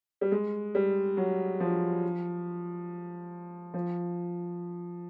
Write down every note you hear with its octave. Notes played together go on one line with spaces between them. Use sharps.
G3
G#3
G3
F#3
F3
F3